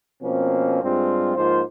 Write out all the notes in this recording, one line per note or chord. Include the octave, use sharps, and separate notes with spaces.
B2 F3 A#3 C4 C#4
G2 G3 G#3 C4 F4
G#2 F3 A#3 F4 C5